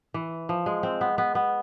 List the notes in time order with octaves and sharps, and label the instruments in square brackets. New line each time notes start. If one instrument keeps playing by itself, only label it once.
[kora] E3
F3
G#3
C4
B3
B3
B3